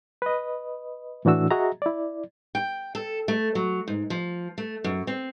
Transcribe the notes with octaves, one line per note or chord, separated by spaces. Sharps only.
B4 D#5
A2 E3 D4 F#4 E6
F#4 G#4 D#5 E5 A#5
E4 D5
G5
A4
A3
F#3
G#2
F3
A3
F#2
C4